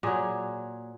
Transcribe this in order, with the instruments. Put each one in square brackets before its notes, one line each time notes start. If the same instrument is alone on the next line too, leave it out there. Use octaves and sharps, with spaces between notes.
[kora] A#2 F#3 G#4